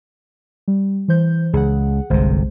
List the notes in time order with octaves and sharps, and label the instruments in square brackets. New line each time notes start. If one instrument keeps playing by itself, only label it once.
[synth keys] G3
E3 C5 G6
[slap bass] C#2 [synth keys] G#4 F#5
[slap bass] G1 C3 [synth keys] C2 G#3 C5